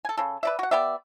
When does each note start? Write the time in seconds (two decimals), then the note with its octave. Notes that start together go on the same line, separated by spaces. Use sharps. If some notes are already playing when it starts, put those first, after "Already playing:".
0.05 A4 G#5
0.17 C#3 A4
0.43 B4 D5 E5
0.59 F#4 F#5
0.71 B3 G4 D5 E5